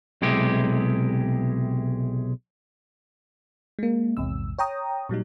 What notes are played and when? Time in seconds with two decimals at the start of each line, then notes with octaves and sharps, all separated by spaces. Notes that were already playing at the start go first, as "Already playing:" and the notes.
0.22 B1 C3 G#3 E4 G4
3.79 G#3 A#3
4.17 A#1 E2 G#2 C3 E6
4.59 C#5 G5 A#5 D#6
5.09 A#2 F#3 G3 D#4